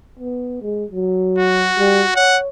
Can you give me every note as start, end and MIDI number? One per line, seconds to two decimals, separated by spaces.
0.19 0.57 59
0.62 0.84 56
0.91 1.70 54
1.39 2.15 66
1.78 2.04 55
2.16 2.49 73
2.16 2.38 78